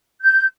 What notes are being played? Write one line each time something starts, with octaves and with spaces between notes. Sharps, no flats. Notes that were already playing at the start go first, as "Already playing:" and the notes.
G6